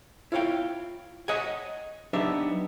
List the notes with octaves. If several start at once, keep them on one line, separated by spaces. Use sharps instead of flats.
E4 F4 C#5 F5 G5
C#5 D#5 F#5 G#5
F#3 B3 D4 D#4 G4 E5